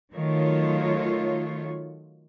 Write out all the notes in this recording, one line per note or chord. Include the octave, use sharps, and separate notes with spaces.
D#3 F#3 A3 F4 C#5